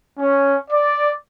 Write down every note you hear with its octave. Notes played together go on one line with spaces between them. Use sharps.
C#4
D5